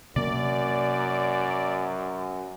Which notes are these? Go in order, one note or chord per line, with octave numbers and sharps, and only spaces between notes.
F#2 C3 A#3 D5